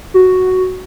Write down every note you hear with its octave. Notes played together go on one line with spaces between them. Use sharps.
F#4